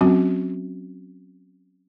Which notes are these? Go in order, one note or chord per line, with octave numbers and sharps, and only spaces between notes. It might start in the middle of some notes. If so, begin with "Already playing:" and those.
F#3 C4 C#4 F#4